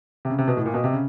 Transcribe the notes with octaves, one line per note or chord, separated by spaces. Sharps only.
C3
C#3
C3
B2
A2
A#2
B2
C3
C#3